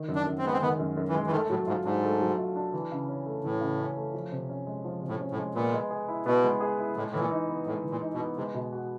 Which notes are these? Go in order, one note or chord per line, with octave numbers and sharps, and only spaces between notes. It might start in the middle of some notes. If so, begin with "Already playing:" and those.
Already playing: D#3
F#2
D4
F#2
C4
G#3 B3
C4
D#3 B3
F#2
F#2
E3
G#3
E3
D#3 A3
A2 F#3
G#2 F4
G#2 D4
A3
F#3
F4
D4
E3
C#3
C#4
A3
A2 E3
C#3
C#4
A3
F3
C3
C#4
G#3
F3
C3
A2
C#4
A2
G#3
A#2 B3
G#3
G#4
E4
B2 B3
G#3
G#4
E4
A2 G#3
A2 E3
A#2
D#4
B3
A2 G#3
E3
A#2
D#4
B2
B3
C3 G#3
B2
F#4